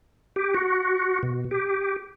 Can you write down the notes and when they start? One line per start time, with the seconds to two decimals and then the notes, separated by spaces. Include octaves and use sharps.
0.36 G4
0.54 F#4
1.23 B2
1.51 G4